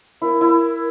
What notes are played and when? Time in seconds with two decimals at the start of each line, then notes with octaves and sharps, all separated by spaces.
0.21 E4 A#4
0.41 E4